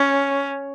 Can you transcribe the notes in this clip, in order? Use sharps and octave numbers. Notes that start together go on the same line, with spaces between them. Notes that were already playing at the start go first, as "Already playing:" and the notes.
Already playing: C#4